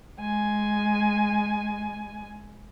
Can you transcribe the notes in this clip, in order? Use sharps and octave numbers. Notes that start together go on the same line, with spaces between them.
G#3 G#5